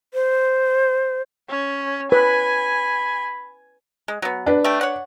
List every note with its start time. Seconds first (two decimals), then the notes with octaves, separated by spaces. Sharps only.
0.14 C5
1.49 C#4
2.12 B4 G#5 B5
4.08 G#3
4.22 F#3 B3
4.46 D4 B4
4.64 A3 G4
4.81 C#5 F#5